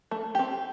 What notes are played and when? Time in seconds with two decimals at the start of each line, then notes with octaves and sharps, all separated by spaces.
0.11 A3
0.35 C4 G4